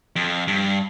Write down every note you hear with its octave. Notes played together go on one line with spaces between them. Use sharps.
F2
G2